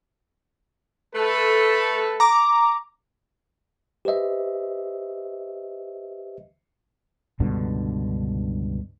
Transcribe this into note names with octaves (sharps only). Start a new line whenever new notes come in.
A3 A4 B4
A#5 D6
G4 B4 C5 D#5 E5
C#2 G2 B2 D3